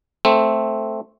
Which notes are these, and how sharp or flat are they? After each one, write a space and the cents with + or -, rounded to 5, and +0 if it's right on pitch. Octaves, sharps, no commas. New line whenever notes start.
A3 +0 C4 +0